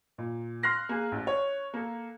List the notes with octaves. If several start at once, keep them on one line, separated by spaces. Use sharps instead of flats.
A#2
C6 F6 F#6 A#6 C7
A#3 G#4
A1
C#5
A#3 A4